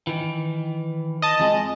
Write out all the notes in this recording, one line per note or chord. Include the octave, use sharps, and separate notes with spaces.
D#3 E3
D#5 A5
F2 G#3